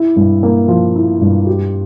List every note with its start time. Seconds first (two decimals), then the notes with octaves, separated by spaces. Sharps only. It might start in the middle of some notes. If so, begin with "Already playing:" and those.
Already playing: E4
0.16 G2
0.43 A#3
0.68 F3
0.95 E4
1.21 G2
1.47 G4